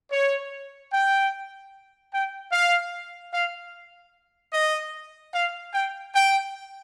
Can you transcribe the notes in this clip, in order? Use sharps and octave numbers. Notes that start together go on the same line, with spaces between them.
C#5
G5
G5
F5
F5
D#5
F5
G5
G5